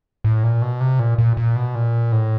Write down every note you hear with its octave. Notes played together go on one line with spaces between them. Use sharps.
A2
A#2
B2
C3
A#2
A#2
A#2
B2
A#2
A2